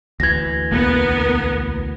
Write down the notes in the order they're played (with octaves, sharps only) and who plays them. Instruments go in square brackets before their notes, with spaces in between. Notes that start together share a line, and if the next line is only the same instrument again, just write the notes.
[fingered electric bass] D2 E3 [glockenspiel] G#6 A#6
[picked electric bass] B1 E2 A#3 [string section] B3 A#4